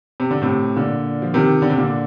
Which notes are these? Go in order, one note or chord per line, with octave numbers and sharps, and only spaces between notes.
C3
D3
A2 C3
A#2 D3
F3
C3 D#3
D3
C3
A#2 D3